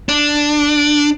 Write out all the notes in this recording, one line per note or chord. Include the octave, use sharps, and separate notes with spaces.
D4